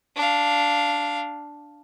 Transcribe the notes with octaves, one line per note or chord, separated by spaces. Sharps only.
D4 F5